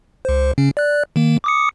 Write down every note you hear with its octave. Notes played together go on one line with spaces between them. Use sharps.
C#2 C5
C#3 C#4
D5 F#6
D#3 A#3
D6 D#6 C#7